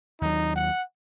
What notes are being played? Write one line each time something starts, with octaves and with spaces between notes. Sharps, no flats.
D#2 F#3 D#4
F#5